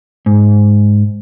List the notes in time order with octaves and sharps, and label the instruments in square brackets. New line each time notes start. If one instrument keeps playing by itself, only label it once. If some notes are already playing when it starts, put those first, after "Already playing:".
[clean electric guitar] G#2